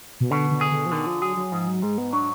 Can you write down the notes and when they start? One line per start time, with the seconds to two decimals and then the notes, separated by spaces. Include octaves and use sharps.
0.20 B2
0.31 B2 D3
0.51 D3
0.61 G#4
0.71 D3
0.86 F3
0.92 D3 D#3
1.07 F3
1.22 F#3 G#4
1.37 F#3
1.52 G#2 F3
1.68 F#3
1.82 G#2 G#3
1.98 B3
2.13 F#3 D4